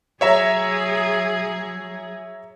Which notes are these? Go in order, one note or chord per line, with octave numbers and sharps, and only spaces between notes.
F#3 G#4 C#5 E5 A#5